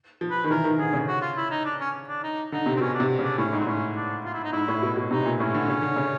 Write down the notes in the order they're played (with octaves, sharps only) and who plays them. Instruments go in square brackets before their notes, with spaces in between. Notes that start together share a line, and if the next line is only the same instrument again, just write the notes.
[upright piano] F3
[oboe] B4
[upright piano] D#3 [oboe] B4
[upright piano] E3 [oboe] A#4
[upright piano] D#3
[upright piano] D3 [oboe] G#4
[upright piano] C#3
[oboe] F#4
F4
E4
D#4
D4
C#4
D4
D#4
[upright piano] D3 [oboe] D#4
[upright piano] C3
[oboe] C4
[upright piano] B2 [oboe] C#4
[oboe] D4
[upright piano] C3
C#3
[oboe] D4
[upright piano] A2 [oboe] C#4
[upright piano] G#2
[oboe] C4
[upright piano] A2 [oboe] C#4
[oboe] D4
F4
E4
D#4
[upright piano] G#2 [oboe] E4
[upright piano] A2
B2
B2
[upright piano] C3 [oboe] D#4
[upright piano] A#2
[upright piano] A2 [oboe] C#4
[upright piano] D3
C#3
D3
C#3